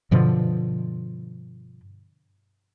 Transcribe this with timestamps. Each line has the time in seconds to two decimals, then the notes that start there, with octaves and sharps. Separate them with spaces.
0.11 G2 B2 D3 F3